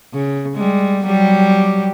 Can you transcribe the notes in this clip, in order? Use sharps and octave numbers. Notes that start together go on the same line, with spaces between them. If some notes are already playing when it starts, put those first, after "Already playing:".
C#3
G3 G#3
F#3 G3 G4